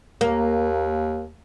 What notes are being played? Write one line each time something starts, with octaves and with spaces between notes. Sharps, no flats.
D#2 A#3